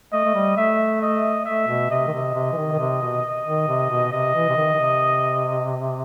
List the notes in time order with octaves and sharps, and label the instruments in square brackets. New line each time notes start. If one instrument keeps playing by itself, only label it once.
[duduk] A3 [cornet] D#5
[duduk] A3
G3
[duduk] A3 [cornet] E5
[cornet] D#5
[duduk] A3 [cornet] E5
[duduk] B2
[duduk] C3 [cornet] D#5
[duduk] D#3
C3
C3
E3
D#3
D#3
C3
B2
D#3
C3
B2
[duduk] C3 [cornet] D#5
[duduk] E3
C3
D#3
D#3
C3